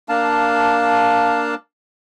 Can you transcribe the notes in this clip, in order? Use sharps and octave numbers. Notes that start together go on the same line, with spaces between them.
A#3 D4 F5 A5